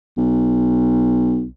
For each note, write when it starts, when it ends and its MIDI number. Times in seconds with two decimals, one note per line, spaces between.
0.17 1.46 35